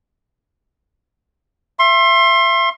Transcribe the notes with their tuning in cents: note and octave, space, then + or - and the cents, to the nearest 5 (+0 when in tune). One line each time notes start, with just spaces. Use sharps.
E5 +30 C6 +30